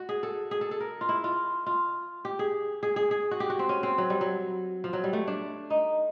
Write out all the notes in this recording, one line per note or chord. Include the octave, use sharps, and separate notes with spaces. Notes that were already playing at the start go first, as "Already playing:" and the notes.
Already playing: F#4
G#4
A4
G#4
A4
A4
A#4
F4
E4
F4
F4
G4
G#4
G#4
G#4
G#4
F#4
G4
F#4
C4
C#4
C4
F#3
G3
F#3
F3
F#3
G3
A3
D4
D#4